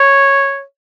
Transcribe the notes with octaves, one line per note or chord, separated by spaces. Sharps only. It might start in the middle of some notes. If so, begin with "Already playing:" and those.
Already playing: C#5